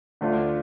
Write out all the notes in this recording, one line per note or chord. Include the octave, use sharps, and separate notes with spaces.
D2 D3 A3 D4 F4